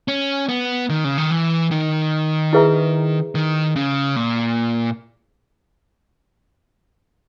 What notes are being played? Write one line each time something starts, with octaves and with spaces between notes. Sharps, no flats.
C#4
B3
D#3
C#3
D#3
E3
D#3
E4 G#4 B4 E5 A#5
D#3
C#3
A#2